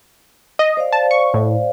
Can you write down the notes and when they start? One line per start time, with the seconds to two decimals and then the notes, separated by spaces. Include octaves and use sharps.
0.59 D#5
0.77 C5 D5 F5
0.92 A5
1.11 C#6
1.34 A2